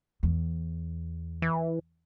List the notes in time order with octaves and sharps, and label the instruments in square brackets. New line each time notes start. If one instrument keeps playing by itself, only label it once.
[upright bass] E2
[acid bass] E3